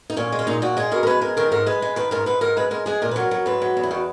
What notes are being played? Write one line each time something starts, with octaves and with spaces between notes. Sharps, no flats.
D#4
A#2 C#4
G#3
C#4
A#2 D#4
A#2 F#4
G#3 G#4
B2 A#4
A#4
G#3 B4
G#3 A#4
D#3 A#4
G#2 A#4
G#3 B4
G#3
D#3 B4
G#2 A#4
G#2 B4
G#2 A#4
G#3 B4
G#3 A#4
G#3 G#4
A#2 A#4
B4
F#3 A#4
F#3
G#2 B4
F#3
E2
E4
D#3 F#4